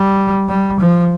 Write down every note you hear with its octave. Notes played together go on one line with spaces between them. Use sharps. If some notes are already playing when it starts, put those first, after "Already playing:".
Already playing: G3
G3
F3